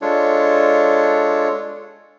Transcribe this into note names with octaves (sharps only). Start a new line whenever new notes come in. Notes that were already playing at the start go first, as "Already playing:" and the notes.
G#3 D4 F4 A4 C#5